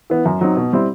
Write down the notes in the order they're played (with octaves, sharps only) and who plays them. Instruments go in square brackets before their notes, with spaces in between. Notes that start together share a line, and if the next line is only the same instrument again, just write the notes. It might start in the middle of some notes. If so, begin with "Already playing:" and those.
[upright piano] E3 B3
F#2
F#3 C4 D#4
B2
G3 C4 E4